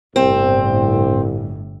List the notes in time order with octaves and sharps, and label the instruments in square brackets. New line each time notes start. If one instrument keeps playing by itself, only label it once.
[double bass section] G1 A2 [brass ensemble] C2 [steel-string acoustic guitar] C4